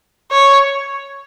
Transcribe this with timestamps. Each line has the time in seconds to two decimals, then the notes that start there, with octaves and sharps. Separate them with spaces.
0.32 C#5